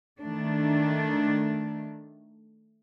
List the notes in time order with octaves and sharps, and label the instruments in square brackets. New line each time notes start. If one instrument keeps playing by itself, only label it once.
[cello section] D#3 A3 D4